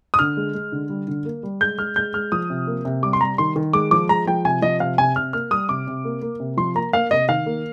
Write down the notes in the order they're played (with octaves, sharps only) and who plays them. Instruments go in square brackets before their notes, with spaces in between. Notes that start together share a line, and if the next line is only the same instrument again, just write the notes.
[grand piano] D#6
D3 F6
G#3
G#3
D3
G3
D3
A#3
G3
G#3 G6
G#3 F6
G#3 G6
G#3 F6
F3 D#6
C3
A#3
C3
G3 D6
C6
G3 A#5
D#3 C6
D#3
G#3 D6
F3 D6
G#3 A#5
F3 G5
C3 G#5
F3 D#5
C3 F5
C3 G#5
C3 F6
A#3 F6
G3 D#6
C3 D6
C3
A#3
A#3
C3
F3 C6
A#3 A#5
A#3 F5
C3 D#5
D#3 F5
A#3